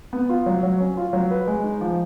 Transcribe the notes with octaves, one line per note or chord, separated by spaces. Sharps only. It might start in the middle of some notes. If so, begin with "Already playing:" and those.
B3
F4
F#3
F#3
C#4
F4
F#3
B4
G#3
D#4
F3